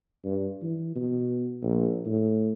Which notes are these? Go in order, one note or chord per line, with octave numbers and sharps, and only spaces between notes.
G2
E3
B2
A#1
A2